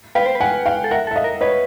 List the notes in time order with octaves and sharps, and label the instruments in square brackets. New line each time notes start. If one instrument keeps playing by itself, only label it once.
[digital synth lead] B4 [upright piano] F5 G5
[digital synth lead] C5
B4
[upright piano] F#5 G#5
F5 G5
[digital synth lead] A4
[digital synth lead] A#4 [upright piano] E5 F#5
[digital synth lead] A4
[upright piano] E5
D#5 F5
[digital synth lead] A#4
[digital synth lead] B4 [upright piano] C#5 D#5